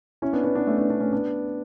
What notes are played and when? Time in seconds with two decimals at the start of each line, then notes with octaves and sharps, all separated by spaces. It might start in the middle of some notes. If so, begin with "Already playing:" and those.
0.22 C#4 E4
0.33 B3 D4
0.44 B3 D4
0.55 B3 D4
0.67 A3 C#4
0.78 B3 D4
0.89 B3 D4
1.00 A3 C#4
1.13 B3 D4